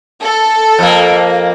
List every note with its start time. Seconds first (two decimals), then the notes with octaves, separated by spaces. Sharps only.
0.25 A4
0.79 F2 A#3